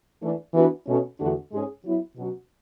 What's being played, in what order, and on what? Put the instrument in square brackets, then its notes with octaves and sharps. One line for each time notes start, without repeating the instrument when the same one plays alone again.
[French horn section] E3 A3 D4
E3 B3 D4 F#4 B4
B2 A3 C#4
E2 D3 A3 D4 F#4
G#2 G#3 C#4 G#4
F#3 B3 E4
B2 F#3 C#4 F#4